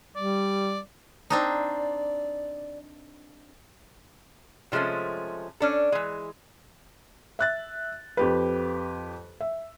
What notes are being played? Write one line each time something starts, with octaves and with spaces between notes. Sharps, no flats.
G3 D5
C4 D4 D#4 D5
C3 F3 G#3 A3 C#4
C#4 D4 A4
E3 G#3
E5 F#6 A6
F2 G4 B4
E5